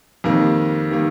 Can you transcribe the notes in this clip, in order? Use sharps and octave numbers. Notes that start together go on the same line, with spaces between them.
F2 D#3 G3 A#3
D#3 G3 A#3